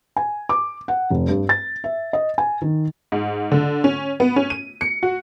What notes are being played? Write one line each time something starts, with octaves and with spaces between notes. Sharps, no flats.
G#5
D6
F#5
F1
G2
A6
E5
D#5
G#5
D#3
G#2
D3
C#4
B3
C#4
D#7
C#7
F#4